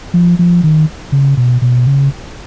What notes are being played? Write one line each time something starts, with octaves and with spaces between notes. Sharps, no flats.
F3
F3
D#3
C#3
B2
B2
C#3